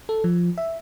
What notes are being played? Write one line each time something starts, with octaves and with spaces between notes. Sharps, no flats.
A4
F3
E5